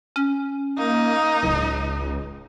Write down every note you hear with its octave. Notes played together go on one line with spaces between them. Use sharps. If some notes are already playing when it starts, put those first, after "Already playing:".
C#4
A#3 D#4
D1 C#2